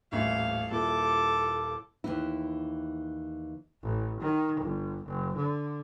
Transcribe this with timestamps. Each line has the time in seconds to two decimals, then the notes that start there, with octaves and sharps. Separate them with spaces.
0.12 D#1 A1 E5 F5
0.71 D#1 A#2 E4 A4 D6
2.04 D#2 E3 E4
3.83 A1
4.20 D#3
4.61 G1
5.05 F#1
5.36 D3